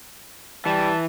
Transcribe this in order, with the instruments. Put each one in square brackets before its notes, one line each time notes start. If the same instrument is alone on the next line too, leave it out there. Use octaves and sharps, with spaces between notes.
[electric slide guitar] E3 [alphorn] G3 [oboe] A5